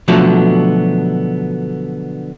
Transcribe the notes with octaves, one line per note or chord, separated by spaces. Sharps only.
B2 D3 F3 F#3 A3 B3